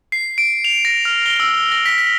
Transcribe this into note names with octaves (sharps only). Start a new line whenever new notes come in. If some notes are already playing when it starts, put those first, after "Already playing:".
C7
D7
F7
A#6
F6
G7
E6
A#6
B6
B6